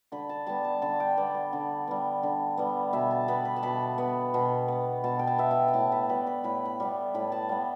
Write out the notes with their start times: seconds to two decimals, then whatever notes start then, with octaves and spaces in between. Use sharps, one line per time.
0.12 D3 B5
0.29 A5
0.47 G3 B3 A5
0.64 A5
0.82 D3 A5
1.00 G5
1.17 G3 B3 D5
1.35 D5
1.53 D3
1.88 G3 B3
2.23 D3
2.57 G3 B3
2.93 B2 E5
3.11 A5
3.28 B3 B5
3.45 B5
3.56 A5
3.63 B2 B5
3.98 B3
4.34 B2
4.68 B3
5.04 B2 A5
5.19 G5
5.27 A5
5.38 B3 E5
5.51 G5
5.68 B5
5.73 A2 A5
5.92 B5
6.09 G3 B3 B5
6.27 B5
6.44 A2 B5
6.65 B5
6.80 G3 B3
7.14 A2 B5
7.32 A5
7.49 G3 B3